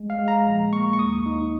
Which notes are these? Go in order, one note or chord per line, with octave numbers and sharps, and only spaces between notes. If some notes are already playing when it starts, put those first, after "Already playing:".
Already playing: A#1 G#3
F5
G#3
A#5
A#1
A#3 C#6
C#6
D#2 D#6
D#4